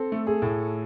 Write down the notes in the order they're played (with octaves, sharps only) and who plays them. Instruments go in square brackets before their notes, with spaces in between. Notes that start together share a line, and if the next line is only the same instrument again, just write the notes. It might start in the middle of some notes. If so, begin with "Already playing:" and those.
Already playing: [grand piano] C4 [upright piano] A4
[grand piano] A3
[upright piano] G#4
[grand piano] A2